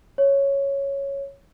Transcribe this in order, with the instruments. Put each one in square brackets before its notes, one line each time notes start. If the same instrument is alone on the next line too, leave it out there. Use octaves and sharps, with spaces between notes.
[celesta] C#5